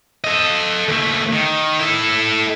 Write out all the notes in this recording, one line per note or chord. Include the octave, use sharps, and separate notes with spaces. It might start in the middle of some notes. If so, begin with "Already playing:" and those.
A4 D#5
D#2 A3
D#3
E4 A4